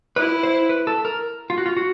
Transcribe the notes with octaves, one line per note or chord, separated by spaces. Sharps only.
E4 B4
C5
B4
A4
A#4
F4
F#4
F4
F#4